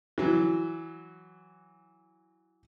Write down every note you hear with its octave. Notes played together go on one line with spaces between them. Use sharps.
E3 F#3